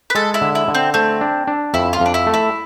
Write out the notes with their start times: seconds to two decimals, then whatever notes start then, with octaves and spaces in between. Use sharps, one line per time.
0.10 B4
0.15 G#3 A4
0.34 E4
0.41 D3
0.55 E4
0.68 D3
0.75 C4
0.94 A3 C4
1.21 D4
1.47 D4
1.74 F2 E4
1.93 F4
2.00 F2
2.06 D4
2.14 E4
2.27 A3
2.34 E4